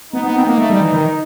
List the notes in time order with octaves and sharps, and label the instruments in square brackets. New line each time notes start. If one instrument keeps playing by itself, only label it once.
[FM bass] B3 [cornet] D#4
[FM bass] B3
C4
B3
A#3
A3
G3
E3
D#3